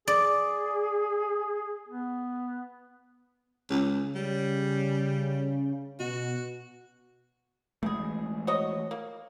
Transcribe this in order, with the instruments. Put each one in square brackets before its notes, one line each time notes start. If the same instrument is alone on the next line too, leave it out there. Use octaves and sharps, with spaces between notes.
[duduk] G#4 [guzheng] D5
[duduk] B3
[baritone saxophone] C#2 [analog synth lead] C#3
[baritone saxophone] G3
[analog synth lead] B2 [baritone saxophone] F#4
[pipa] B2 G#4 [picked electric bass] E3 G#3 A3
[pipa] F#4 C#5 D#5
A#3